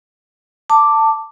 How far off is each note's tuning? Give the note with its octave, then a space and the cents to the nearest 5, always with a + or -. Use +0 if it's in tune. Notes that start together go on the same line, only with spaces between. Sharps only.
A5 +15 D6 +0